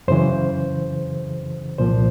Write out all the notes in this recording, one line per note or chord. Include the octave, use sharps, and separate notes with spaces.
F#2 C#3 E3 C5
C2 A#2 F3 C5